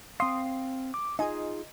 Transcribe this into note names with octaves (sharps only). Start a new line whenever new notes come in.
C4 F5 C6 D#6
D6
D#4 F4 G#4 D#5 G#5